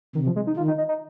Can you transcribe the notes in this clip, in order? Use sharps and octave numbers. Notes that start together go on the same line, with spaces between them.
C3 D#3
F3
G#3
D#4
D#3 F4
D#4
D#4
D#4